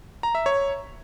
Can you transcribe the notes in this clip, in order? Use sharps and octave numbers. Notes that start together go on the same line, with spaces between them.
A#5
E5
C#5